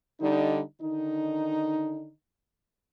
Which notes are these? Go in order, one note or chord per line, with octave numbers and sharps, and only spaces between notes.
D3 G3 D#4
D3 D#3 D#4